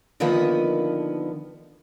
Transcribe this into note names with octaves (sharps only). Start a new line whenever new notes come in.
D3 D#3 F3 A#3 B3 B4